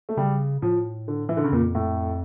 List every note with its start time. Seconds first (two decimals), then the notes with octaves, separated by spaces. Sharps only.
0.09 A3
0.17 C#3 G3
0.62 A2 F3
1.08 D3
1.29 E3
1.37 D3
1.44 C#3
1.52 F2 A#2
1.75 A2